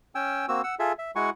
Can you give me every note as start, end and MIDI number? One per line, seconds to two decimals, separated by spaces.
0.15 0.46 61
0.15 0.46 79
0.15 0.46 80
0.15 0.46 88
0.48 0.62 58
0.48 0.62 60
0.48 0.62 66
0.48 0.62 88
0.64 0.75 78
0.64 0.75 88
0.79 0.92 65
0.79 0.92 68
0.79 0.92 69
0.79 0.92 76
0.99 1.11 76
1.16 1.30 56
1.16 1.30 64
1.16 1.30 66
1.16 1.30 78
1.16 1.30 80
1.16 1.30 85